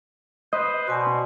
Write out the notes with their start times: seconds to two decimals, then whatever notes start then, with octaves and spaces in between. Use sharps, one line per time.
0.53 B4 C5 D#5
0.88 B2 D5 G#5 C6